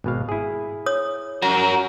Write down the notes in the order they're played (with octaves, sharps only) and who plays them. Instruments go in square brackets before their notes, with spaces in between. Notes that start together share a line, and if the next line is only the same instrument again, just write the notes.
[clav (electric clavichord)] G#1 B2 F5
E4 G#4
[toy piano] C#5 D#6
[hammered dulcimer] F#3 C#4 A#5 [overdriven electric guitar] F#4 A#4